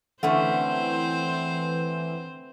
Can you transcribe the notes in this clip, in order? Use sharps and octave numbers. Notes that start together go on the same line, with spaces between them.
D3 E3 A3 C4 C#4 C5 F#5